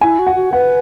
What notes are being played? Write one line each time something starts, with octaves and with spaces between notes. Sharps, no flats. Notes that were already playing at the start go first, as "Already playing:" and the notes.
E4 G#5
F#4
F#5
F#4
B4 F#5